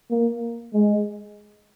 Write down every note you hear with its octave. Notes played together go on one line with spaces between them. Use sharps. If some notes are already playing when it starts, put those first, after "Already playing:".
A#3
G#3